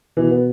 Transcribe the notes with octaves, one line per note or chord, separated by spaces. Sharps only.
B2 E3
B3